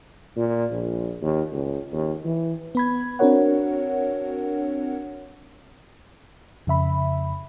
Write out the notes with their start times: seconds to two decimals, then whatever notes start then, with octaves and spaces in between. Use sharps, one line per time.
0.36 A#2
0.72 A#1
1.22 D#2
1.52 C#2
1.92 D#2
2.25 E3
2.75 B3 B5 G#6
3.19 C4 D4 F#4 A#4 C#5 F#5
6.67 F2 C#3 E5 B5